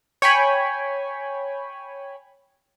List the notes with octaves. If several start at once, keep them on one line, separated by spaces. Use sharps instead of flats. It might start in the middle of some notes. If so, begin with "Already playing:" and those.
C#5 G5 G#5 B5